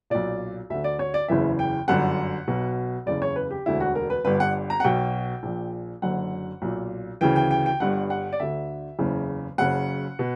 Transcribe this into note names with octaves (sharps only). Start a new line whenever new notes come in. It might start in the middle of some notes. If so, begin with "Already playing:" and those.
B1 A#2 D5
D2 D3 E5
D5
C#5
D5
F#1 E2 C#3 E3 E5
G5
G1 F#2 D3 F#5
B1 B2
F#1 E2 C#3 D5
C#5
B4
G4
E1 D2 D3 E4
F#4
A#4
B4
G1 G2 D3 B4
F#5
A#5
F#5
B1 B2 G5
A#1 A#2
F#1 F#2 D3 F#5
B1 A#2
D2 C#3 E3 G5
G5
G5
G5
G1 G2 D3 F#5
F#5
D5
D2 D3 E5
F#1 E2 C#3
F#1 F#2 C#3 F#5
B2